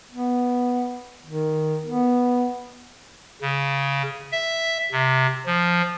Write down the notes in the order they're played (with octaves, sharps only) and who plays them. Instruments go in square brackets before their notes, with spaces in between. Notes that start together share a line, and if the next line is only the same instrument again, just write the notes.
[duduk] B3
D#3
B3
[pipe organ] C#3
E5
C3
F3